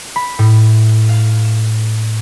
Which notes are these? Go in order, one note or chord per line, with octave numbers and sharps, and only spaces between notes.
B5
A2
F5
E7